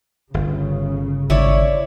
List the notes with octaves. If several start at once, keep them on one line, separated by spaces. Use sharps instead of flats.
G1 C#3
G#1 E4 C#5 D5